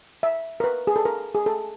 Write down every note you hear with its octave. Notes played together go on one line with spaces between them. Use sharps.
E5
A#4
B4
G#4
A4
A#4
G#4
A4